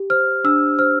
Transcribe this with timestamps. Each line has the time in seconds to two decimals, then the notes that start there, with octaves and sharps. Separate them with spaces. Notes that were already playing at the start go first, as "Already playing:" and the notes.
Already playing: G4
0.10 C5 F6
0.44 D4 E6
0.79 C5 F6